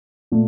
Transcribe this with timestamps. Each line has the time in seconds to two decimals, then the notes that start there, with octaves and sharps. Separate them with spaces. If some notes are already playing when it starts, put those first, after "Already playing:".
0.32 A#2 A3